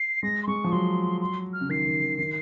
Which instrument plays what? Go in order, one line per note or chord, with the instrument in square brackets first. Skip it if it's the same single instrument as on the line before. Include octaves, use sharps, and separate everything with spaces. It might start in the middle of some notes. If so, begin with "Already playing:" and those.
Already playing: [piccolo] C7
[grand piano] G#3 [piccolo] A#6
[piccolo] C6
[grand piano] G#3 [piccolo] C#6
[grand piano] F3
[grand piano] F#3 [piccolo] C6
[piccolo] C6
F6
[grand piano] C#3
[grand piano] D#3 [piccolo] C7
[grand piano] D#3
D#3
D#3